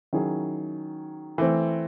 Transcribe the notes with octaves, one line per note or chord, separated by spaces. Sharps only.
D#3 F#3 C#4 E4 G#4
E3 A3 C4